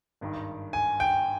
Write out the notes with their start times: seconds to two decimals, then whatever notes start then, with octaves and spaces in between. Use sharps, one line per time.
0.21 G#1 G2 D#3
0.73 G#5
1.00 G5